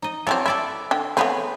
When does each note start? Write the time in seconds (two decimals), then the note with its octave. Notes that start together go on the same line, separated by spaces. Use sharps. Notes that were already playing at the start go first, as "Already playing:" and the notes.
0.02 D#4 D#5
0.27 E3 F#3 C4 A4 C#5 D5
0.46 E4 A4 D5 E5
0.91 D3 G5
1.17 A3 B3 C4 G#4 B4 C#5